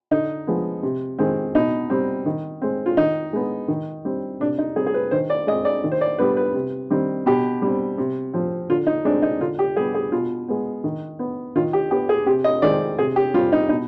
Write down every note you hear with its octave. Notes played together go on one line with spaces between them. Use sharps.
D3 D#4
F3 G#3 B3
C3
D#3 G#3 C4
B2 D#4
G3 C4
D#3
G#3 C4
F4
D#3 D#4
G#3 B3
D#3
G3 C4
C3 D4
D#4
G3 C4 G#4
G#4
B4
D#3 C5
D5
G#3 C4 D#5
D5
D#3
C5
D5
G3 B3 B4
B4
C3
D#3 G3 C4
B2 G4
G3 C4
C3
F3 C4
D3 F4
D#4
G#3 C4 D4
D#4
D3 F4
G4
G3 B3 G#4
G#4
B2 F4
G#3 B3
D#3
B3
D#3 F4
G4
B3 G4
G#4
C3 G4
D#5
D#3 G#3 C4 D5
C3 G#4
G4
G3 C4 F4
D#4
B2 D#4